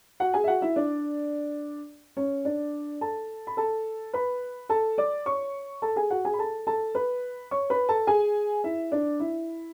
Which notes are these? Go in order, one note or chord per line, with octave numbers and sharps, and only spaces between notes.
F#4 F#5
G#4 G#5
E5
F#4 F#5
E4 E5
D4 D5
C#4 C#5
D4 D5
A4 A5
B5
A4 A5
B4 B5
A4 A5
D5 D6
C#5 C#6
A4 A5
G#4 G#5
F#4 F#5
G#4 G#5
B5
A4 A5
A4 A5
B4 B5
C#5 C#6
B4 B5
A4 A5
G#4 G#5
E4 E5
D4 D5
E4